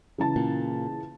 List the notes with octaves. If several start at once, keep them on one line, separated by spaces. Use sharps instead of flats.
C#3 E3 A5
A#2